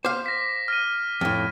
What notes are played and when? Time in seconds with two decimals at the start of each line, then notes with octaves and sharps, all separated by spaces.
0.05 C5 F5 D6
0.26 A#6 B6
0.68 F6 A#6 D#7
1.21 F2 A2 F6